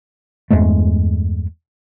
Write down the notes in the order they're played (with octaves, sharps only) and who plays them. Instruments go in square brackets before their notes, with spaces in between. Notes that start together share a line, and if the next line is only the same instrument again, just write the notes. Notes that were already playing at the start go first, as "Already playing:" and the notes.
[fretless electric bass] E2 G2 G#3 A3